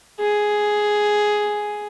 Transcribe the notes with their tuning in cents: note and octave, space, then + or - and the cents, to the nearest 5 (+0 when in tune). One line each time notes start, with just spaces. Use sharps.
G#4 +5